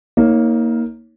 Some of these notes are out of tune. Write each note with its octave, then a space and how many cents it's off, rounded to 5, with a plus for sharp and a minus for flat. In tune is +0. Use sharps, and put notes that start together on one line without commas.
A#3 +0 D#4 +35 C#5 +0